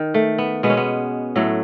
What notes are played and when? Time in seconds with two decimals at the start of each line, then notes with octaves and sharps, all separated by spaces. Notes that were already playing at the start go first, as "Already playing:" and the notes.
Already playing: D#3
0.14 A3
0.38 B3
0.63 B2 G#3 B3
0.70 C#4
0.77 B3
1.36 A2 F#3 A3